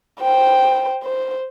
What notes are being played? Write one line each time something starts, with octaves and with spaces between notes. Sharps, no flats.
C5 G5
C5